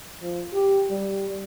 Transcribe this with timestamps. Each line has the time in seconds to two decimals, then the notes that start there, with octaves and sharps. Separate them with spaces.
0.22 F3
0.54 G4
0.90 G3